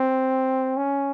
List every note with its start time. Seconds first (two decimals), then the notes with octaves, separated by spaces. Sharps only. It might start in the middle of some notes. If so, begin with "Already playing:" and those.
Already playing: C4
0.77 C#4